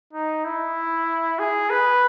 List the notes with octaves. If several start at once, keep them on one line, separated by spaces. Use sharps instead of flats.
D#4
E4
G#4
B4